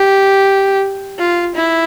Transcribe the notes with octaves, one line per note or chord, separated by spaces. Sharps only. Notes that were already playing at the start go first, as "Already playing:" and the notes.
Already playing: G4
F4
E4